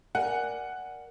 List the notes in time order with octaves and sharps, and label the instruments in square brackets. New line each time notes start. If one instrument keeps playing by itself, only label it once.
[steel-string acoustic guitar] A#4 D5 G#5 [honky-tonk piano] F#5